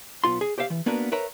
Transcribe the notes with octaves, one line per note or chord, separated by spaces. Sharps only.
B1 B3 F4 C6
G#4
G4 C5 E5 F5
E3
A#3 B3 D4 F#4 A#4 B4
A#4 B4 C#5 E5 A#5